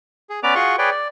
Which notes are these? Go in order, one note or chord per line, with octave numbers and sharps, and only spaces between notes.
G#4
B3 C#4 B4 D5 A#5 D6
F4 F#4 G#4 F#5 C6 C#6
G#4 B4 C#5 D5 G5
D5